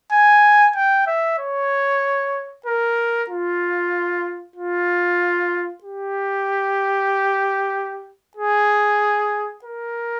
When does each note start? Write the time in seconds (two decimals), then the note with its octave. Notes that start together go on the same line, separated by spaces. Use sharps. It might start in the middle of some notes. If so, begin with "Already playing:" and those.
0.13 G#5
0.76 G5
1.07 E5
1.39 C#5
2.66 A#4
3.30 F4
4.56 F4
5.84 G4
8.37 G#4
9.65 A#4